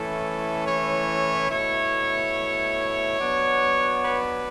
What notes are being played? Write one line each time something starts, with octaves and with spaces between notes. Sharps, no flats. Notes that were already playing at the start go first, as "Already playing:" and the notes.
Already playing: E3 A3 C#4 E4 A4
C#5
B2 A3 E4 C#5
F#3 B3 D4
B4